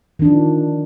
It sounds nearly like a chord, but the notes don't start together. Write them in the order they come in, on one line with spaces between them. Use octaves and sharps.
D#3 D4 F3